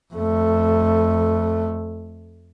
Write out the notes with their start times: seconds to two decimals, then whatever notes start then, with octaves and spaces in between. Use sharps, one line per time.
0.14 F2 A3